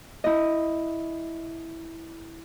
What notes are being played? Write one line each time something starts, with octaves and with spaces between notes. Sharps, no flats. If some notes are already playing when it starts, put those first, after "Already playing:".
E4 D#5